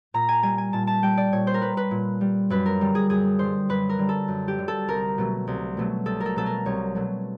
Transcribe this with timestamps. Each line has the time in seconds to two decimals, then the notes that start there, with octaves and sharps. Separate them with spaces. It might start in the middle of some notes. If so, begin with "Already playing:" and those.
0.14 A#2 A#5
0.29 G#5
0.43 G3 G#5
0.58 G#5
0.73 A#2 A5
0.87 A5
1.03 G3 G5
1.17 D5
1.33 A#2 C#5
1.47 C5
1.54 A#4
1.62 G3 B4
1.77 B4
1.91 A#2
2.21 G3
2.50 F#2 B4
2.66 A#4
2.81 D3 G3
2.95 G#4
3.10 F#2 G#4
3.39 D3 G3 C5
3.69 F#2 B4
3.89 A#4
3.99 D3 G3
4.09 A4
4.28 F#2
4.48 G4
4.58 D3 G3
4.68 A4
4.88 C2 A#4
5.18 B2 F#3 A3
5.47 C2
5.77 B2 F#3 A3
6.06 C2 A4
6.20 A#4
6.26 A4
6.36 B2 F#3 A3 A4
6.46 A#4
6.66 C2 C#5
6.95 B2 F#3 A3